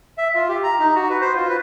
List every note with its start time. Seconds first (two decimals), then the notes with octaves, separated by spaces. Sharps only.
0.18 E5
0.35 F4
0.48 G4
0.63 A#5
0.79 D#4
0.95 F#4
1.10 B4
1.21 C5
1.36 F4
1.49 B4